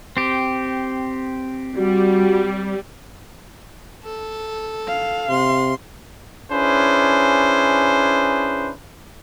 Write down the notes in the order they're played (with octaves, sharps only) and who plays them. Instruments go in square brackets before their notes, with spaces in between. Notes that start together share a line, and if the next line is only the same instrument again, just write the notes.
[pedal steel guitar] C4 G4
[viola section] G3 [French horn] F#4
[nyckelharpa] A4
[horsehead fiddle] F5
[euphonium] C3 [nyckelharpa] C6
[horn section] C#4 D4 E4 G#4 B4 C5